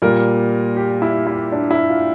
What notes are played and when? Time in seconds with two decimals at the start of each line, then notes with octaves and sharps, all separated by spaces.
0.02 A#2 G3 A#3 A#4
0.77 G4
1.02 E4
1.27 E4
1.52 D4
1.71 E4
1.89 F4